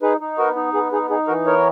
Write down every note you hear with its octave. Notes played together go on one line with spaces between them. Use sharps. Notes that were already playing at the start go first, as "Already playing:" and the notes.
D#4 G#4 B4
D#4
B3 F#4 A#4
D#4
B3 G#4
D#4 G#4
D#4 G#4
E3 F#4 A#4
B3 A#4 C#5